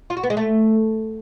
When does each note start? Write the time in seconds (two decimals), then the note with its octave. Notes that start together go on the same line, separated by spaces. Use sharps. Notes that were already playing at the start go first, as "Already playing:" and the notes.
0.10 F4
0.17 F#4
0.23 B3
0.30 G#3
0.37 A3